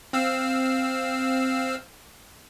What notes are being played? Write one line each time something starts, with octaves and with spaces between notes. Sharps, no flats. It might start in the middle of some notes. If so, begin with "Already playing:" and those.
C4 F5 E6